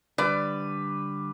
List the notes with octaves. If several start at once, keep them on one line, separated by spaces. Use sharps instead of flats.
D3 G3 B4 D5